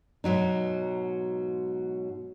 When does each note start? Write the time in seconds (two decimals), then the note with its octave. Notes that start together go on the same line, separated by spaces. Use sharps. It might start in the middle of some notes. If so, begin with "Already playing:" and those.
0.24 G#2 B2 F#3 D#4